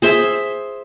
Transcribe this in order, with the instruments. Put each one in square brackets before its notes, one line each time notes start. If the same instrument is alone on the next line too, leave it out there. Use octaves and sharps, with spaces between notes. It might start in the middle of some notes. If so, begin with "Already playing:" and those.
[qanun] G#4 C5 E5